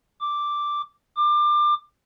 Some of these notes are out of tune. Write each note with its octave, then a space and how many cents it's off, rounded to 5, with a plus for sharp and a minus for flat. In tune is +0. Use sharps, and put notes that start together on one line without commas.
D6 +0
D6 +25